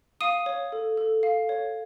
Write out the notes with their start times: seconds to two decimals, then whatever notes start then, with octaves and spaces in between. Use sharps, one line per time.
0.21 F5 D#6 D#7
0.46 C#5
0.72 A4
0.97 A4
1.23 F5
1.49 C#5